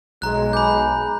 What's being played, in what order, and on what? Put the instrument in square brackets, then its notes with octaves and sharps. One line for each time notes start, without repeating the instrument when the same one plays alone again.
[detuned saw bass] B1 [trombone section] G#3 [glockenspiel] A#5 F#6
[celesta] G#5 A#5 D6 [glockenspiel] B5 G6